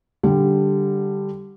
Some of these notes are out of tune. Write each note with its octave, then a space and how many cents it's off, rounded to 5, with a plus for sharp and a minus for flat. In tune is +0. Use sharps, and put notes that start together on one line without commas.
D3 +0 G3 +0